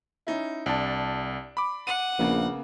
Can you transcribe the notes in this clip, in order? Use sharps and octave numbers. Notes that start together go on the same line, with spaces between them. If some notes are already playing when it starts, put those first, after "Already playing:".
C#4 D#4 E4
C2 D4 A5
B5 D6
F#5 D#7
A#1 C#3 A#3 B3